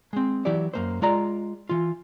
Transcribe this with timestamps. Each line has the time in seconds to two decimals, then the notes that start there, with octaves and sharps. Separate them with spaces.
0.13 G#3 C4
0.45 E3 F#3 E4 G4 D5
0.74 F#2 A#3 C5
1.02 G#3 F4 D5 A#5
1.69 E3 F4